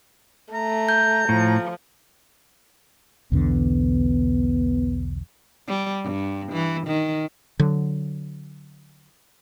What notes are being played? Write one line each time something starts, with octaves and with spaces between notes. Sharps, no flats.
A3 A#5
G6
A2 F3
B1 E2 D3 B3
G3
G2
E3
D#3
D3 F#3